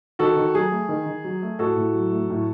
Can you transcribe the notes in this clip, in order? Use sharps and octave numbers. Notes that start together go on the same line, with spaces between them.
D#3 F#4 A4
D#3
F#3 G#4
A3
D#3
D#3
F#3
A3
A2 F#4 A4
A2
F#3
A3
A2